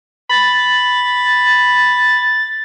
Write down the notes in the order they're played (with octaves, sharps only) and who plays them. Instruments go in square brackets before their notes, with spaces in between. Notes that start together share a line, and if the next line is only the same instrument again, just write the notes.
[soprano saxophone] B5 [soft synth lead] A6